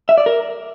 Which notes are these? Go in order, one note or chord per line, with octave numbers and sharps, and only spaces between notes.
E5
D5
A#4